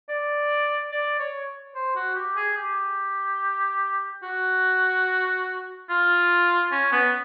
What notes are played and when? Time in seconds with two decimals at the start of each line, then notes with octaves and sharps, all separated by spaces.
0.09 D5
0.92 D5
1.19 C#5
1.75 C5
1.96 F#4
2.16 G4
2.36 G#4
2.57 G4
4.23 F#4
5.89 F4
6.72 C#4
6.92 B3